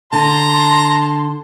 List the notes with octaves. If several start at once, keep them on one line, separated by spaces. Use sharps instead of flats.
D3 A5 A#5 C6